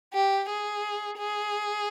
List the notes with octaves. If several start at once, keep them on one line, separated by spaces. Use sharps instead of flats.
G4
G#4
G#4